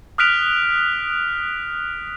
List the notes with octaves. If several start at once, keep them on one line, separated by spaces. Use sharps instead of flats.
D#6 F6 F#6 B6 D7 F7